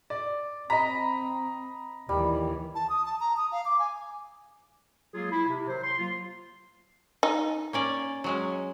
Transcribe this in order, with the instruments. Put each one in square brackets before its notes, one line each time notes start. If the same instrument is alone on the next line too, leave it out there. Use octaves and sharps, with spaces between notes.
[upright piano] D5
[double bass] C4 [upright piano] D#5 A#5 [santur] B5
[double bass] D#2 E3 [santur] G3
[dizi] A5
D#6
A5
A#5
D#6
F5
D6
G#5
[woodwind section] F#3 G#3 A#3 F4 G#4
E4
C3
D#3 F#3 C5
C6
F#3 A#3 F4
[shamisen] D#4
[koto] A#3 C#4 D5
F#3 G#3 C#4